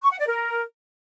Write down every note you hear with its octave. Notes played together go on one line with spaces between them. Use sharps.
C#6
F#5
D5
A#4